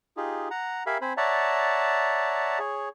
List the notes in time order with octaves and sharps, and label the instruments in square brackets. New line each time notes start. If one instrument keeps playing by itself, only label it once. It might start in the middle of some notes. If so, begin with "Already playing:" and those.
[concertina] D#4 F4 G4 G#4
F#5 A#5
G4 A#4 E5 F5 G#5 B5
C4 C5 G#5 B5
C#5 D5 E5 F#5 A5 A#5
G#4 C#5